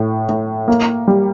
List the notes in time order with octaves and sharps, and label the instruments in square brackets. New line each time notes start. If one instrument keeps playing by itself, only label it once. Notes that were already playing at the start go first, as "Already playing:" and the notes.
Already playing: [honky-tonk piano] A2
A2
A#3
G3